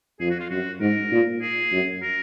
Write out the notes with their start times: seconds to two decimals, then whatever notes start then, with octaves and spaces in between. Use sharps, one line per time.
0.20 F2 G#4
0.30 F#4
0.40 F4
0.50 F#2 F#4
0.81 G#2 A#4
1.11 A#2
1.41 G#4
1.72 F#2
2.02 A#4